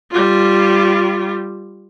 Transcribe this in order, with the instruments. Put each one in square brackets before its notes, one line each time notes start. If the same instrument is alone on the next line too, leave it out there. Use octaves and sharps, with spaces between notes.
[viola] G3 F4